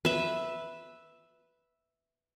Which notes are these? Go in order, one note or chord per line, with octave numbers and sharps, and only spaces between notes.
B4 E5